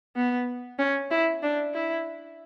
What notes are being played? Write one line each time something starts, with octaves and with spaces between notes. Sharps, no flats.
B3
C#4
E4
D4
E4